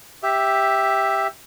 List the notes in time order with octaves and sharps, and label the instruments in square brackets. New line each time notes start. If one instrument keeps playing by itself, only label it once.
[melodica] G4 E5